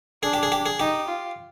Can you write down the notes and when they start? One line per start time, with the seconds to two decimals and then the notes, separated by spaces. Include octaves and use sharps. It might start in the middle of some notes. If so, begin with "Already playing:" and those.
0.23 D4 G#4
0.33 G4
0.43 G#4
0.52 G4
0.66 G#4
0.80 D#4 G4
1.08 F4